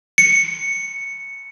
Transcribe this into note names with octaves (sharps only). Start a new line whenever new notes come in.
C#7